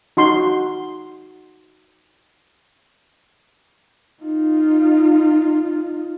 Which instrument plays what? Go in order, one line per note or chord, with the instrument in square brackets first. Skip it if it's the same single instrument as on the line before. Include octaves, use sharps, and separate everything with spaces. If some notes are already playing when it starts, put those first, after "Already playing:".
[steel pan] D#4 F#4 C6
[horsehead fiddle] D#4 F4